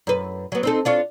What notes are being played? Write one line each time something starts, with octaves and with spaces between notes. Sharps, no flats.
F#2 B4
F#3 B3
C4 D#4 A4
D4 F4 C#5